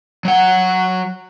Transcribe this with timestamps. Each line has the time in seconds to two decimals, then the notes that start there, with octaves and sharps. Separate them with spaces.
0.25 F#3 F#5